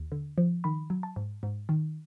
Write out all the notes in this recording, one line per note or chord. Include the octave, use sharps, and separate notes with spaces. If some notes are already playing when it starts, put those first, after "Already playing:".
Already playing: D#2
D3
F3
D#3 B5
F#3
A5
G#2
G#2
D#3